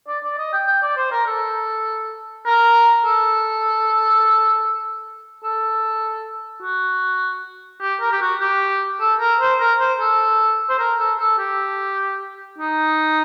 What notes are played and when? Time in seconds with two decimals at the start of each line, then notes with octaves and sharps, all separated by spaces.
0.08 D5
0.24 D5
0.38 D#5
0.53 G5
0.67 G5
0.82 D5
0.97 C5
1.12 A#4
1.27 A4
2.46 A#4
3.05 A4
5.44 A4
6.62 F#4
7.81 G4
8.01 A#4
8.12 G4
8.21 F#4
8.41 G4
9.00 A4
9.20 A#4
9.40 C5
9.60 A#4
9.80 C5
10.00 A4
10.70 C5
10.79 A#4
10.99 A4
11.19 A4
11.38 G4
12.58 D#4